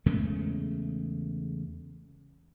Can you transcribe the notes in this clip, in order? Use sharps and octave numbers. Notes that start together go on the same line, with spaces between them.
E2 C#3 G#3 A3